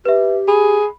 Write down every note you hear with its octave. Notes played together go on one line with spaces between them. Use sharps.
G4 B4 E5
G#4 B5